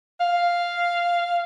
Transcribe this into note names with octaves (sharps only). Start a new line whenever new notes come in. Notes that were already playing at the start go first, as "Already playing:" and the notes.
F5